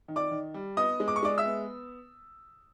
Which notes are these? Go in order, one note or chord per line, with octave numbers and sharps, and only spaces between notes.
D#3
D5 D6
D#3
G3
B3 D#5 D#6
G#3
D6
C#6
G#3 D5 D6
E5 E6
B3